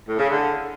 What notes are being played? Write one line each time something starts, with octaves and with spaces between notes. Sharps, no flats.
A2
C#3
D3